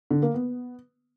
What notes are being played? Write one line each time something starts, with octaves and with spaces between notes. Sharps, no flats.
D3
A#3
B3